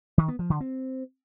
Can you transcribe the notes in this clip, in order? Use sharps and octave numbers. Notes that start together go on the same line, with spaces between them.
D#3
B3
F3
D3
C4